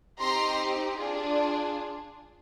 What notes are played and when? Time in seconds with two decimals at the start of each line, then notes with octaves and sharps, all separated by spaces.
0.20 C4 D#4 G4 A#5 C6
0.99 D4 F4 G#4